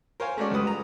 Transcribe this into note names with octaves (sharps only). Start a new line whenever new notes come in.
A#4 C5 C#5 F5 G#5
G#3 A3 C#4 F#4 A4 D5
C#2 G3 B4 D#6
A#5